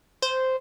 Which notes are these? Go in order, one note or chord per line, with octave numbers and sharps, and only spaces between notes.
C5